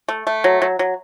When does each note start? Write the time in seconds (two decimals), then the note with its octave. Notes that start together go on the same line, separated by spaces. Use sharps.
0.08 A3
0.27 A3
0.44 F#3
0.62 F#3
0.79 F#3